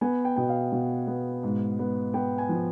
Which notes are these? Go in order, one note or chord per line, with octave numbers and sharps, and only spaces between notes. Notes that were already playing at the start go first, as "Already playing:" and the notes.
B3 G#5
G5
B2 G5
F5
B2
B3
G#2
B3
B3 G5
G#5
F3